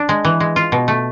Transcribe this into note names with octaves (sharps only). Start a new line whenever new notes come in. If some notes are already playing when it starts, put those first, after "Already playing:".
Already playing: D4
G#3
E3
G#3
F4
B2
A3